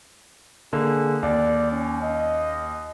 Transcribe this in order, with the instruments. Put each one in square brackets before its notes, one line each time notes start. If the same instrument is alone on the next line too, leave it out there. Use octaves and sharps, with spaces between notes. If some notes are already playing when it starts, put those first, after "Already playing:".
[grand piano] D3 A#3 [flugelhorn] G#4
[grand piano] D#2 [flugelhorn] D5
[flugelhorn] C#4
D#5